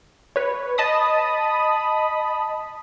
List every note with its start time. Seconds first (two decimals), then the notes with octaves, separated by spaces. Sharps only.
0.36 B4 C#5
0.78 D#5 A5 B5 D#6